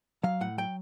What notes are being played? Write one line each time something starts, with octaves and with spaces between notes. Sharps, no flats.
F#3 F5
A2 F#5
F#3 G5